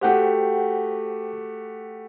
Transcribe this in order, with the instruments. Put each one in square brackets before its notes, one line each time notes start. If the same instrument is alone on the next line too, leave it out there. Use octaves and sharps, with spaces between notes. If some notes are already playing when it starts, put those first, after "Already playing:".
[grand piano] A3 F#4 G4 [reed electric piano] C5 F#5 G5